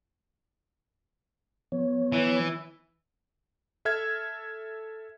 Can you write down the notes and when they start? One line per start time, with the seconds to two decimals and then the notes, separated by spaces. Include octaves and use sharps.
1.72 F3 B3 C#5
2.12 E3
3.85 A4 E5 F6 G#6